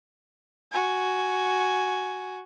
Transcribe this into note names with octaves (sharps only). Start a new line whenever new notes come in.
F#4 G#5